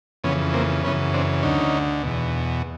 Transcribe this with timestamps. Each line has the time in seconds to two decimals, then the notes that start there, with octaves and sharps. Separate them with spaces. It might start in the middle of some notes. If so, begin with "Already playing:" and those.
0.24 F2 C#3 E3 B3 C#4
0.53 A#3 C4
0.83 F#2 C#3 E3 B3 C#4
1.14 C4 D4
1.43 D2 D3 C#4 D#4
2.03 E2 B2